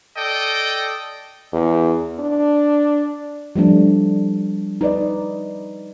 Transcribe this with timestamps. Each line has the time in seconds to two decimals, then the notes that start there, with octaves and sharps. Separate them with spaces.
0.16 A4 D5 D#5 G5
1.52 E2
2.20 D4
3.56 F3 G3 A3 D4
4.81 D#4 B4 D5 D#5